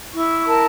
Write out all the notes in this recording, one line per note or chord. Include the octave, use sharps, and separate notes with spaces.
E4 C#6
A#4 A5